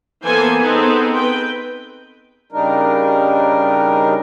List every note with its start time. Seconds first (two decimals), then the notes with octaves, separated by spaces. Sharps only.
0.24 E3 A#3 B3 A4 C5 G#5
0.60 B3 C4 D#4 G#4 A4 B4
1.14 B4 G5
2.52 C#3 G3 D4 D#4 A#4